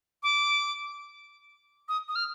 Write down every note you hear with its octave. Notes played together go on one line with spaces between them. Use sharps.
D6
D#6
D#6
F6